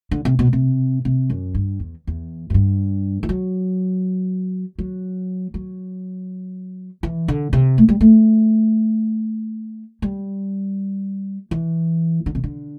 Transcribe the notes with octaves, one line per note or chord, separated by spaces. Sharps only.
D3
C3
B2
C3
C3
F#2
G2
E2
E2
F#2
G2
E3
F#3
F#3
F#3
E3
D3
C3
A3
G3
A3
G3
E3
D3
C3
D3